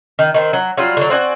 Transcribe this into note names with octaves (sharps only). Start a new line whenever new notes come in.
D#3
D#3 B3 C4
F#3
F#3 G3 F4
D3 F#3
C4 F#4 D5 G#5